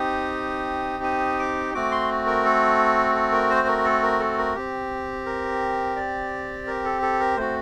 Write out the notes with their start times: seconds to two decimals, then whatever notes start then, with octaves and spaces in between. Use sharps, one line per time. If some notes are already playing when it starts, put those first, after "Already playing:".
Already playing: C4 D#4 G4 D#6
1.04 D#6
1.39 D6
1.74 A3 C4 F#4 D6
1.92 C6
2.27 A#4
2.45 A4
3.15 A4
3.32 A#4
3.50 C5
3.68 A#4
3.85 A4
4.03 A#4
4.20 A4
4.38 A#4
4.55 C4 G4
5.26 A#4
5.96 D5
6.67 A#4
6.84 A4
7.02 A4
7.20 A#4
7.37 A3 C4 F#4 C5